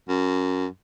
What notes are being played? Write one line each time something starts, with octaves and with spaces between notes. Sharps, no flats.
F#2